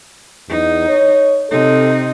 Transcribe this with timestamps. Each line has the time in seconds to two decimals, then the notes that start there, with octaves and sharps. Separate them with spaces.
0.49 E2 D#4
0.89 C#5
1.51 C3 D#4 A4